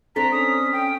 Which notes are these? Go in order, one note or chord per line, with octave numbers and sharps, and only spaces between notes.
C4 D4 A4 A#5 B6
C#4 D#6
G5